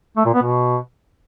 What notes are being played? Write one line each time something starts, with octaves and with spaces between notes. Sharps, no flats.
A3
A#2
B3
B2